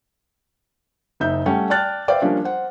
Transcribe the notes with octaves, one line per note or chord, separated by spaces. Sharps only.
F#1 D#4 E5 G6
G3 A3 C#4 C#5 F#5 G5
D5 G5 A5 F6 F#6 A6
B4 C5 D5 E5 F5 G5
F3 G3 A#3 C#4 D4
C5 F#5